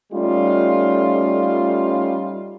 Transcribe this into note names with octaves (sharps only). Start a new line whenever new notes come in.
G3 A3 C#4 D#4 F4